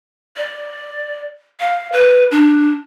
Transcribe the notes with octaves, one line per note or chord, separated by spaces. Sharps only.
D5
F5
B4
D4